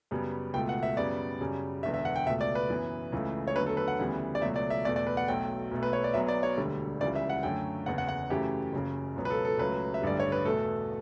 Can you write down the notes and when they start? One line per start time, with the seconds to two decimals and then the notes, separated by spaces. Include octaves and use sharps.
0.11 F#2 C#3 G3 B3
0.54 C#2 B2 A3 G5
0.69 F#5
0.83 E5
0.97 F#2 C#3 G3 B3 D5
1.41 F#2 C#3 G3
1.83 E1 E2 D3 E5
1.94 E5
2.05 F#5
2.16 G5
2.26 C#2 B2 A3 E5
2.41 D5
2.55 B4
2.70 F#2 E3 B3
3.12 C#2 C#3 E3 A3
3.47 C#5
3.56 E2 D3 F#3 A3 B4
3.66 A4
3.77 B4
3.88 F#5
3.99 D2 C#3 E3 G3 B3
4.35 D5
4.42 C#2 B2 F#3 A3 E5
4.56 D5
4.70 E5
4.85 E2 B2 A3 D5
4.96 D5
5.07 B4
5.17 F#5
5.28 B1 B2 F#3 A3 G5
5.71 B1 B2 A3
5.83 B4
5.93 C#5
6.04 D5
6.14 B1 B2 F#3 B3 E5
6.28 D5
6.43 C#5
6.57 E1 D2 D3 G3
7.00 C#2 C#3 E3 G3 D5
7.15 E5
7.30 F#5
7.43 F#2 D3 F#3 A3 G5
7.86 F#1 E2 C#3 F#5
7.98 F#5
8.09 F#5
8.30 F#2 C#3 E3 A3 G4
8.73 F#1 F#2 C#3
9.16 C#2 B2 F#3 B3
9.25 B4
9.30 A4
9.45 A4
9.58 C#2 C#3 F#3 A3 B4
9.94 E5
10.02 A1 G2 D3 G3 D5
10.20 C#5
10.32 B4
10.45 E2 B2 A3 A4